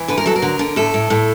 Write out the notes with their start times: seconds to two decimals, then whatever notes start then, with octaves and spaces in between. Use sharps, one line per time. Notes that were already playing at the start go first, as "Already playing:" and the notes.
Already playing: E3
0.08 D3 B4
0.18 A#4
0.26 F#3 A4
0.36 A#4
0.42 D3
0.59 D3
0.76 A2 A4
0.94 A2
1.10 A2